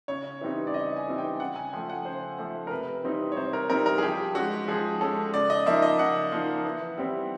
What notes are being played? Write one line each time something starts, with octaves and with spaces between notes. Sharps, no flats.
C#3 C#5
E3 G3 C4 D#4
D5
C#3 D#5
G#5
E3 G3 C4 D#4
G5
C#3 F#5
G#5
F3 A3 G5
F#5
C#3 C5
F3 A3
A#4
C3 B4
E3 G3 C4 D#4
C#5
C3 C5
A#4
E3 G3 C4 D#4 A#4
A#4
G#4
F3 G4
G#3 C#4 F#4
F3 G#4
G#3 C#4 A4
C#3 D5
D#5
F3 A#3 D#4 E5
D#5
C#3 F#5
F3 A#3 D#4
E3
G3 C4 E4